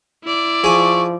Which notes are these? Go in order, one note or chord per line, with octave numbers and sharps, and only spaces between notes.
E4 D5
F3 G#4 G#5 C#6